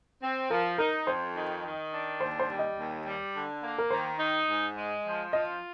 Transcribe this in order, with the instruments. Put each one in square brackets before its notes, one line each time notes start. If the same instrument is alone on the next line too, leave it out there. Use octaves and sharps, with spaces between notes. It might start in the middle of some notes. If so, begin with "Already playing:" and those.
[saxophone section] C4
[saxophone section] F3 [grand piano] A#4
[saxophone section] D#4 [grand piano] A#4
[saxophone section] F2 [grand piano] C5
[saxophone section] D#3
D#3
D4
[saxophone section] D#2 [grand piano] C5
[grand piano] C5
[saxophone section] G3
[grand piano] D#5
[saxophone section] D#2
G3
D3
A#3
[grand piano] A#4
[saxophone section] D#3 [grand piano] C5
[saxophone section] D#4
G#2
G#3
F3
[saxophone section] F4 [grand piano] D#5